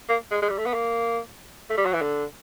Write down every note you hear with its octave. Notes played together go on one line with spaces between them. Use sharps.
A#3
G#3
G#3
G3
A3
B3
A#3
A3
G3
F#3
E3
D3